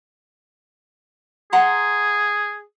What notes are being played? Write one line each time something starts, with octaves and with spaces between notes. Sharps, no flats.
G#4 F#5 A#5 C6